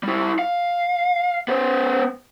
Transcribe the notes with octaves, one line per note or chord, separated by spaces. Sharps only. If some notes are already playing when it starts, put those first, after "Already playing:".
G3 E4
F5
B3 C5